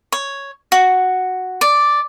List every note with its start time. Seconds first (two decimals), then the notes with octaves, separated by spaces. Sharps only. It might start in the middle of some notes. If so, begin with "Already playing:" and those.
0.12 C#5
0.72 F#4
1.61 D5